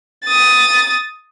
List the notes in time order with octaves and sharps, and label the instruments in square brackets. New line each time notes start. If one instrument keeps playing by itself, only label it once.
[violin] D#6 A6